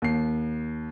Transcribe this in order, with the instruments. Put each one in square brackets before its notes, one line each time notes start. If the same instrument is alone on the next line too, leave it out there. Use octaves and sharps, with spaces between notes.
[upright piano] D#2 C7